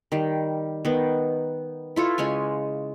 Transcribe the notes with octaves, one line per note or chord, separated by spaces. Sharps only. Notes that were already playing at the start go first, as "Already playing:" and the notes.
D#3 G3
D#3 B3
E4 F4 A4 C#5
C#3 G#3 C#5 G#5